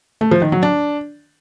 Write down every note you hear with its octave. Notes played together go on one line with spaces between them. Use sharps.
A3
F3
D#3
F#3
D4